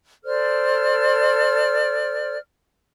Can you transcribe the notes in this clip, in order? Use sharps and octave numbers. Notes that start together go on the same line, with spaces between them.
A4 C5 D5 F6